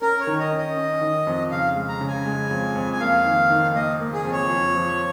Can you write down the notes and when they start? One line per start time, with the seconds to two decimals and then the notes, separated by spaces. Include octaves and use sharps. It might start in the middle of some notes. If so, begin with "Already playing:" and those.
0.02 C#4 A#4
0.20 C#5
0.27 D#3
0.40 D#5
0.52 C#4
0.59 D#5
0.77 C#4
1.01 D#3
1.27 F2
1.51 C#3 F5
1.76 G#3
1.89 A#5
2.01 C#3
2.08 G#5
2.25 G#3
2.51 F2
2.76 F2
2.93 G#5
3.00 A#3 F5
3.25 D#3
3.50 D#3
3.75 A#3 D#5
4.00 A#3
4.13 G#4
4.25 F2
4.32 C#5
4.50 F4
4.75 F3